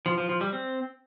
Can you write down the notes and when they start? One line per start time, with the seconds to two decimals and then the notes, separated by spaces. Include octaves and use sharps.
0.06 F3
0.17 F3
0.29 F3
0.41 G3
0.53 C4